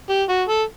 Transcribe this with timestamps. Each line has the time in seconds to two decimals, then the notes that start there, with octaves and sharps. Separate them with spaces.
0.09 G4
0.29 F#4
0.48 A4